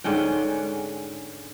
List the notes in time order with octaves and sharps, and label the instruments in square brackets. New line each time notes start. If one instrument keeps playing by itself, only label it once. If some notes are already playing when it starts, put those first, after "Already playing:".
[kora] G#2 D3 C#4 G5